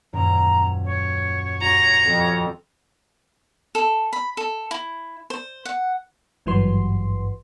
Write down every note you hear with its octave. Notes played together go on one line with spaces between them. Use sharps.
D#1 F#2 A#5 D7
C#5
F#4 G4 A#5
F2 A4
A4
B5
A4
E4
C5
F#5
G#1 G2 E3 F#3 B4 C6